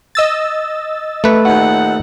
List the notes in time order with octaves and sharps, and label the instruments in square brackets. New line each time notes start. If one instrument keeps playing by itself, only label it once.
[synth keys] D#5 E6 A6
[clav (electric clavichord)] A3 B4
[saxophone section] D#2 A#2 F#5